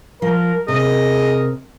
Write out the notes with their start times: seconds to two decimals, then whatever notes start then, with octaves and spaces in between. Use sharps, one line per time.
0.22 F3 A#4
0.68 C3 G#4 A#4 D#5